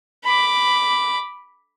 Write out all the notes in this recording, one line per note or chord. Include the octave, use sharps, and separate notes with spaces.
B5 D6